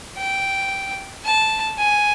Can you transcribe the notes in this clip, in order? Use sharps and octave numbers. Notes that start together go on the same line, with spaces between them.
G5
A5
G#5